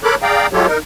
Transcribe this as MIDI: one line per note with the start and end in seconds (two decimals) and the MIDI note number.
0.04 0.15 69
0.04 0.15 70
0.04 0.15 73
0.04 0.15 83
0.04 0.15 86
0.04 0.15 90
0.22 0.47 68
0.22 0.47 74
0.22 0.47 77
0.22 0.47 79
0.22 0.47 82
0.53 0.67 54
0.53 0.67 56
0.53 0.67 65
0.53 0.67 67
0.53 0.67 69
0.53 0.67 73
0.67 0.78 63
0.67 0.78 70